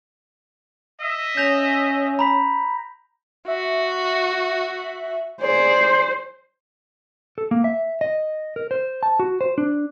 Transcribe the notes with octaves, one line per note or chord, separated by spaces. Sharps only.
D#5 E5
C#4 G6 A#6 F7
A#5 B5 B6
F#4 E5
G#4 C5 D5
A4
A#3
E5
D#5
A#4
C5
A5
F#4
C5
D4